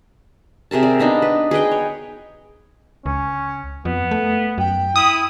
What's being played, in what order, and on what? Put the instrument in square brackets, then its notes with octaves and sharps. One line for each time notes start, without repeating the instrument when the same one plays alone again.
[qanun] C3 G#4 A#4 A5
D5
B3 D4 D#4
B4
G#4 B4 D#5 G5
C#5
[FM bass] C#2 [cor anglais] C#4
[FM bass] F2 [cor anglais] B3
[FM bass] A3
[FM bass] F#2 [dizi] G5
[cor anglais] E4 [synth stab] D#6